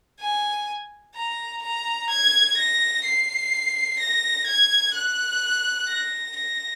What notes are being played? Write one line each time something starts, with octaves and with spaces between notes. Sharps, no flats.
G#5
A#5
A#5
G#6
A#6
C7
A#6
G#6
F#6
A#6
A#6